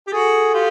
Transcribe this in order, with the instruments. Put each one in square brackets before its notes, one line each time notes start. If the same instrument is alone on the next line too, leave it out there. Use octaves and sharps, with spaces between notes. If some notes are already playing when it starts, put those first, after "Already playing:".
[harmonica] G4
[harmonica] F#4 G#4 [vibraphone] A4
[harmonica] F4 G4